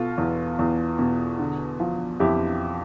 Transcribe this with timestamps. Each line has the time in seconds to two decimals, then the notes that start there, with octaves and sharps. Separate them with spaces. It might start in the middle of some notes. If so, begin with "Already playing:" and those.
Already playing: B2 F4 A4
0.18 E2
0.59 E2
0.99 B2
1.39 D3
1.80 F3
2.20 F2 E4 G4